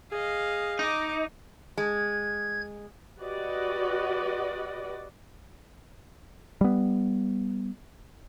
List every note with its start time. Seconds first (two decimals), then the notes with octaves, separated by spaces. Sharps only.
0.12 G#4 D#5 F5
0.79 D#4 D#5 D6
1.78 G#3 G#6
3.21 F#4 G4 B4 D5 D#5 F#5
6.61 G3 B3